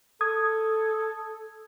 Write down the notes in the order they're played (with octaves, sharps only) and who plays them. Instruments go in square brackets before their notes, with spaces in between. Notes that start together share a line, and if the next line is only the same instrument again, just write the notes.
[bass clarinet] A4 [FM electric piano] D#6 G#6